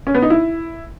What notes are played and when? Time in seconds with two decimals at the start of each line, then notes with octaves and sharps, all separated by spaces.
0.07 C#4
0.15 B3
0.22 D#4
0.30 E4